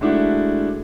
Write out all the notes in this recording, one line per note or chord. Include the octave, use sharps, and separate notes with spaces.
G#3 A3 D4 E4 F#4